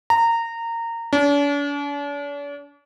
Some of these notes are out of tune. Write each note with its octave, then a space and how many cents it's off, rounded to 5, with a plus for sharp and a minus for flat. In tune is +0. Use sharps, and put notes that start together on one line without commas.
A#5 -20
D4 -45